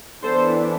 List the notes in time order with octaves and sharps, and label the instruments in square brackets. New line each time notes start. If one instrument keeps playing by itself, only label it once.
[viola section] E3 B3 D4 A4 C5